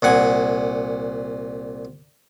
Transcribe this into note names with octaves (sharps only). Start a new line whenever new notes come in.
C2 A#2 F#5 G#5